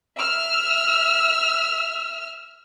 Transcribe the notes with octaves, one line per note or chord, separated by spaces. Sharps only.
E5 E6 F6